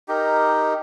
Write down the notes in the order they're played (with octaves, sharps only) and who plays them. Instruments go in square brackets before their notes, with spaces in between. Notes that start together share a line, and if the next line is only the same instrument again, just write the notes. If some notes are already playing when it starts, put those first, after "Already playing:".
[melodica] D#4 G4 A#4